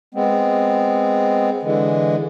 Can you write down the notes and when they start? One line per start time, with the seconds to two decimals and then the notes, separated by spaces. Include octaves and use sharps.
0.14 G#3 B3 C4
1.63 D3 E3 G#3